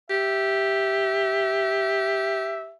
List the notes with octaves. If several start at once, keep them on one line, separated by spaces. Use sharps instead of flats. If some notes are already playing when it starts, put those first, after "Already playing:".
G4 E5